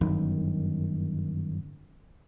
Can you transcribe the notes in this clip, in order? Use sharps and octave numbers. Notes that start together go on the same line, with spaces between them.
G1 F#2 D#3